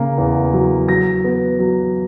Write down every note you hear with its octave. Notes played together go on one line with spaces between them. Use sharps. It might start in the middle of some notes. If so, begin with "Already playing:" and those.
Already playing: C#3 A#3
E2
F#3
F#3 A#6
B3
F#3